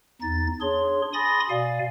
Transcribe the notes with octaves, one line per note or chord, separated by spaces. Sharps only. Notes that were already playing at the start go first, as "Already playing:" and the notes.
E2 D#4 A6
D4 G#4 C#5 C6
G#5 B5 C6 D#6 A6 A#6
B2 D5 F5 G#5